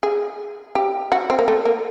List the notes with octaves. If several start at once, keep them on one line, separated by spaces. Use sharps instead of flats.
G#4
G4
F#4
C4
A#3
A3
A#3